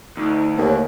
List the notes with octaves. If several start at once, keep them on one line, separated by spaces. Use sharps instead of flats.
D2 D#4
D#2 A#3 C#5